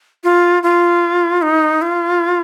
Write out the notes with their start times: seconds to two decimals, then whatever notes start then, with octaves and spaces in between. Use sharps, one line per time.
0.24 F4
0.63 F4
1.42 D#4
1.82 F4